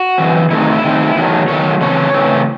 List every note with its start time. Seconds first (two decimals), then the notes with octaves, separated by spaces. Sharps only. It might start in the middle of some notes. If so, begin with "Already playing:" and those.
Already playing: F#4
0.18 F#2 E3 C4
0.51 C3 D#3 A3 C4 E4
0.60 D#4
0.70 E4
0.83 C3 D#3 A3 C4
1.16 E2 D#3 F#3 A3
1.48 E2 D#3 F#3 A3 C#5
1.81 C#3 E3 A3 C4 C#5
2.14 C#3 E3 A3 C4